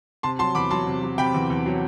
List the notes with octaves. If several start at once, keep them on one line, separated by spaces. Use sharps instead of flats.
C3 A5 C6
F#3 A5 C6
E2 B5 D6
F#3 A5 C6
C3
F#3
C3 G5 B5
E2
E2
F#3